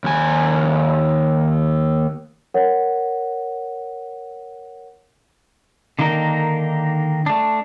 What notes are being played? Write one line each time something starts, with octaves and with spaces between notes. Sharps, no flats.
D#2 G#5
A#4 C#5 F#5
D3 D#3 A#3 D#4 A#4
A3 D4